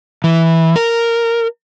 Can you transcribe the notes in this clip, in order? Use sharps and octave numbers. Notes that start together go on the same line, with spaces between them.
E3
A#4